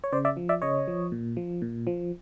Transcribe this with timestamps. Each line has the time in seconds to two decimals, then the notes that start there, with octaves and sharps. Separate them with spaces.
0.04 C#5
0.12 C#3 C5 D5
0.25 D5 E5
0.37 F3
0.49 D5 E5
0.62 C#3 C#5 D#5
0.88 F3
1.12 A#2
1.37 F3
1.62 A#2
1.87 F3